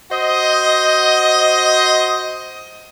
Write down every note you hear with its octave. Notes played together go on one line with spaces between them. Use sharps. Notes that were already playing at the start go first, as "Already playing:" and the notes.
F#4 C5 D#5